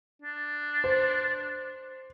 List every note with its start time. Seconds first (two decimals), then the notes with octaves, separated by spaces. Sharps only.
0.22 D4
0.84 C5